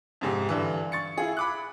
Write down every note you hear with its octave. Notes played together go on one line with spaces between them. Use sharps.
F2 G#2 C3
G2 D3 E3
C#6 A6 C#7
E4 F4 G#4
B5 D6 F#6